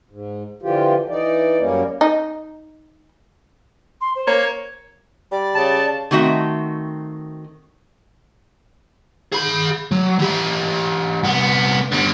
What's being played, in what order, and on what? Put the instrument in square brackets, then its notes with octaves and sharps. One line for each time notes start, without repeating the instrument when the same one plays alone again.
[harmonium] G#2
D3 E3 F3 F4 G4
E3 D#4 D5
F#2 G3 A#3 C#4
[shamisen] D#4
[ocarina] C6
C5
[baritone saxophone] A#3 [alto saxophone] C#5
[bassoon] G3 [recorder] D5
[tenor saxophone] C#3 [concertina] A5
[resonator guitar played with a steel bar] D#3 A3 C4 F#4 E5
[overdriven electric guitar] G#4 B5
F#3
E3 G4
C2 B3
D3 G3